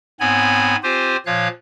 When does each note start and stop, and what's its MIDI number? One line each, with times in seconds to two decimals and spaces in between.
0.20 0.76 44
0.20 0.76 59
0.20 0.76 60
0.20 0.76 73
0.20 0.76 80
0.20 0.76 83
0.83 1.17 60
0.83 1.17 65
0.83 1.17 67
0.83 1.17 72
0.83 1.17 80
1.26 1.48 46
1.26 1.48 53
1.26 1.48 73
1.26 1.48 77
1.26 1.48 90